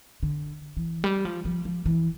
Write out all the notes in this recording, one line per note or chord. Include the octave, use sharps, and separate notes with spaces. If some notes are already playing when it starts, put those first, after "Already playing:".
D3
E3
G3
F3
F3
F3
E3